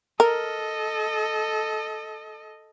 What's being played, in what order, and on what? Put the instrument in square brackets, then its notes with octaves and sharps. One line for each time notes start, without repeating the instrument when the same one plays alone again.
[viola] A4 D#5 [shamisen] A#4